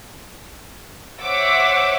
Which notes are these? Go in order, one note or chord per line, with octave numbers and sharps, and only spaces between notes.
C5 C#5 E5 F#5 D6 E6